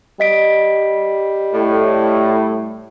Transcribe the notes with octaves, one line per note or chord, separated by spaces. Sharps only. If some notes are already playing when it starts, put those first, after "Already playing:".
G3 D#5 B6 D7
A2